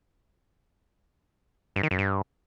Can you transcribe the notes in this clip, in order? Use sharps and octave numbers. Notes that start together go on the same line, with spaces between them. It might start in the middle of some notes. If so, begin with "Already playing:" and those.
G2
D#3
F#2
G2